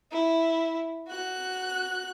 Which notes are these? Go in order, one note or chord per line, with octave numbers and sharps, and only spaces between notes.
E4
F#4 F#6